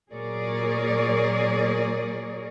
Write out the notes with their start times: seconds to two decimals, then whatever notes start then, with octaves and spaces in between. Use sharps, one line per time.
0.12 A#2 F#3 G#4 A#4 C#5 D5